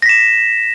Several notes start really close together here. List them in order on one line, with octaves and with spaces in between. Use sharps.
A#6 B6 E7